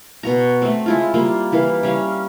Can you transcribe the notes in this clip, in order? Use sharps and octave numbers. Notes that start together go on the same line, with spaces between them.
B2 F#4 A#5
A3 C4
G#3 E4 F4
G3 A#3 F4
E3 A#3 F5
G3 C#4 F5